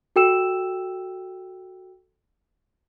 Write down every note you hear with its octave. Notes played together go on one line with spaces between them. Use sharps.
F#4 A4 G5 E6 E7